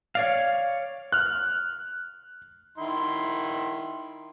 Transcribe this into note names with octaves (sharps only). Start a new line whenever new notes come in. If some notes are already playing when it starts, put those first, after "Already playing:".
C#5 D5 F5
F6 F#6
D#3 E4 C6